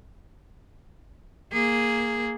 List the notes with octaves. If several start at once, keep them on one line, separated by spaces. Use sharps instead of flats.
A#3 G#4